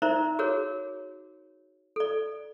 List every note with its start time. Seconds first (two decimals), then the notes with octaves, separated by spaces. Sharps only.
0.02 D#4 A#4 C5 D5 E5 A#5
0.39 F#4 G#4 A#4 C#5
1.96 A4 D5